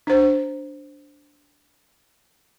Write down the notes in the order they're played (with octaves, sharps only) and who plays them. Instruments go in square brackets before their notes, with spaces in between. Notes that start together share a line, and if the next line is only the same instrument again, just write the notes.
[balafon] D4 C5